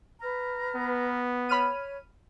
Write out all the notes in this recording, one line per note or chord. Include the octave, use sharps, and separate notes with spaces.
B4 A#5 F6
B3
C#5 B5 F6 D#7